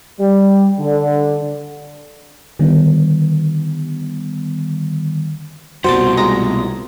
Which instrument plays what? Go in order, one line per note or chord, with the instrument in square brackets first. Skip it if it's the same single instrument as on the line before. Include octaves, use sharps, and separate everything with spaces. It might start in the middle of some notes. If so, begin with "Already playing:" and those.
[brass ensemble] G3
D3
[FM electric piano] D3 D#3 G3 B3
[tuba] C2 [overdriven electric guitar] G2 B2 [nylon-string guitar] F#4 [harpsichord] C5 G5 A5
[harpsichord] G#3 A#5